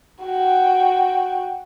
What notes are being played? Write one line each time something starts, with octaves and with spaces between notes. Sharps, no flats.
F#4 G5